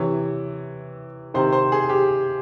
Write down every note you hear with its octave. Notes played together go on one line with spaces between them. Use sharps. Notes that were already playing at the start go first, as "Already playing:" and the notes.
Already playing: C3 E3 C#5
C3 D#3 C5
C5
G#4
G4